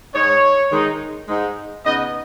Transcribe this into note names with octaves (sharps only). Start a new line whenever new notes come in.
G#2 G#3 D#4 C#5
D#3 G#3 D#4
G#2 G#3 D#4
C#3 B3 D#4 D#5